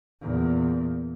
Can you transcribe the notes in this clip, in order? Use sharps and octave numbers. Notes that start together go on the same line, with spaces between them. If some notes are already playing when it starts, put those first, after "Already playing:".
E2 A#2